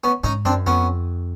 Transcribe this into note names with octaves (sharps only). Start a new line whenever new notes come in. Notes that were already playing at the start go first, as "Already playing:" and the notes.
B3 C#4
G#2 C#4 D#4
F#2 C4 D4
F2 B3 C#4